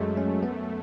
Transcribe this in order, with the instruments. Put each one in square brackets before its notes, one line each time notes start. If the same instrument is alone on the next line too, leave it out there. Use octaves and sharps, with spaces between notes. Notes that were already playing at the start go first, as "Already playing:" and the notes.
Already playing: [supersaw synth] F#2 A3 [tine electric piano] F#3 G#3
[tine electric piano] C#4
B3